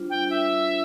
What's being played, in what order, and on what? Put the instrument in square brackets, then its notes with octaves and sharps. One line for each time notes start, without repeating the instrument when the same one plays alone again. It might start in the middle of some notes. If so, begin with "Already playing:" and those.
Already playing: [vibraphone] G3 D4 F4 C5
[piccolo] G5
E5